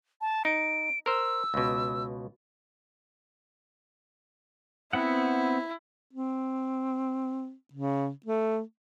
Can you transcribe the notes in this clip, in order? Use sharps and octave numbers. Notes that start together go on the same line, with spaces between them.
A5
D#4 D7
A#4 C5 E6
C#2 B2
B3 C4 E4 F#5
C4
C#3
A3